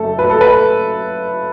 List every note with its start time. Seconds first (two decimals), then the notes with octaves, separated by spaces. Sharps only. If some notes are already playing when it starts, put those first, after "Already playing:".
Already playing: F#1 F#2 A3 A4
0.19 B4
0.30 A4
0.41 B4